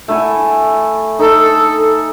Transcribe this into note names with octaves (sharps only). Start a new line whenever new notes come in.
A3 E4 G#5
D#4 A4